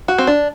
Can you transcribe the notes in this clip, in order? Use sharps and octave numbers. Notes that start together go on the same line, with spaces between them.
F#4
C4
D4